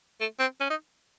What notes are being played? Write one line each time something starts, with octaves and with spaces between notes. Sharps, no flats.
A3
C4
C#4
D#4